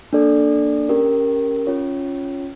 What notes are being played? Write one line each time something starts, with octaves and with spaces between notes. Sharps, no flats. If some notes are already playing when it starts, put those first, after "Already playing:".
A#3 D4 A4 D5
C#4 G4 A#4
C#4 F4 C#5